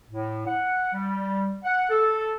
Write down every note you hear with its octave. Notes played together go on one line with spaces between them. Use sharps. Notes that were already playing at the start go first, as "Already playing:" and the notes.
A2
F#5
G3
F#5
A4